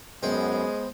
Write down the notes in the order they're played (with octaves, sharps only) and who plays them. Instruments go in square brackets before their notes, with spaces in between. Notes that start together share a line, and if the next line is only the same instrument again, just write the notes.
[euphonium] F#2 [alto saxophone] G#3 [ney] B3 [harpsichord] C4